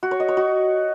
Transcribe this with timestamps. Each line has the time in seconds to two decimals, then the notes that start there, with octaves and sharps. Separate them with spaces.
0.03 F#4
0.11 C#5
0.20 D#5
0.28 C#5
0.37 F#4